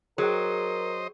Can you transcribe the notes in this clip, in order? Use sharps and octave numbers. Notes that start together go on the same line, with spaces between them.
F#3 G#4 A#4 C5 D#5 G5